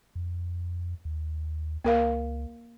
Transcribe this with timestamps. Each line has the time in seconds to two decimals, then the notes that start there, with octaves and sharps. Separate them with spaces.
0.15 F2
1.05 D#2
1.84 C#2 A#3 A#4 F5